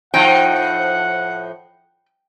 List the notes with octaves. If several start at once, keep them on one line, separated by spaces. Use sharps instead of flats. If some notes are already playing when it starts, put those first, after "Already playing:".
A2 F3 D#4 F#5 G5